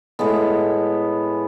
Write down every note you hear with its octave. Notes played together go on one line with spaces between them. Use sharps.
A2 G#3 B3